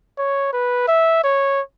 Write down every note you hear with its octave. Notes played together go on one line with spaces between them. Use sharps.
C#5
B4
E5
C#5